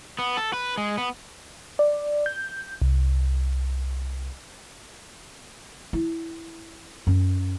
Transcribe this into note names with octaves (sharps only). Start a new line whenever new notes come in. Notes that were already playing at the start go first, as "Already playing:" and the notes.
B3
A4
B4
G#3
B3
D5
G6
C2
E4
F#2